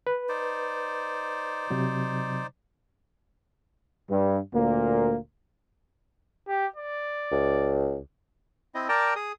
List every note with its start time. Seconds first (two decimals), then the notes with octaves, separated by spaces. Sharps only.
0.07 B4
0.29 D#4 C5 D5
1.70 C3 F#3
4.10 G2
4.53 D2 A#2 A#3
6.48 G4
6.76 D5
7.31 C#2
8.75 C4 E4 D#5
8.89 A#4 D5 G5 A5 A#5
9.16 G#4 D#6